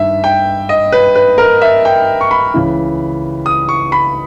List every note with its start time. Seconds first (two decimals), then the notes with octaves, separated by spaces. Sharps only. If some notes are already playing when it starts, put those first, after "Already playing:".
Already playing: G2 D#3 E5
0.24 G5
0.69 D#5
0.92 B4
1.15 B4
1.38 A#4
1.62 E5
1.85 G5
2.21 C#6
2.31 B5
2.54 C#2 C#3 E3
3.46 D#6
3.69 C#6
3.92 B5